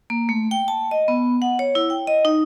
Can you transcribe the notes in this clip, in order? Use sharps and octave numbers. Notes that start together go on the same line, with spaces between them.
A#3
A3
G5
A5
D#5
B3
F#5
C#5
E4
G5
D#5
D#4